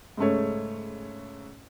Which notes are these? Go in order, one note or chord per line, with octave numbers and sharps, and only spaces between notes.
G#2 C#3 A3 C#5